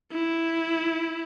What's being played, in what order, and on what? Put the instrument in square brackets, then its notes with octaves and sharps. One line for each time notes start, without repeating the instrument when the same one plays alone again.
[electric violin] E4